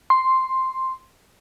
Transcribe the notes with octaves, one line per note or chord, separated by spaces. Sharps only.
C6